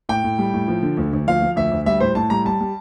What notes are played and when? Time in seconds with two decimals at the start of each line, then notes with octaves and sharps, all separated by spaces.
0.09 A2 G5
0.24 A2
0.39 G3
0.54 A2
0.68 F3
0.83 D3
0.97 D2
1.13 D2
1.28 F3 F5
1.42 F3
1.56 D2 E5
1.71 D2
1.86 G3 E5
2.00 A2 C5
2.15 A2 A5
2.30 G3 A#5
2.45 G3 A5
2.61 G3